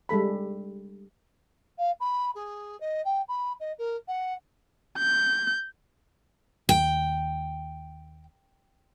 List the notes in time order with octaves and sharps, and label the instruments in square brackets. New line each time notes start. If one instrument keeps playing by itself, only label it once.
[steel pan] G3 G#3 A4 B5
[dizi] F5
B5
G#4
D#5
G5
B5
D#5
A#4
F#5
[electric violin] G6
[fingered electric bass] D#2 [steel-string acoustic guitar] G5